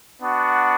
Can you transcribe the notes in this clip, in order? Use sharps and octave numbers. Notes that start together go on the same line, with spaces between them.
B3 D4 F#4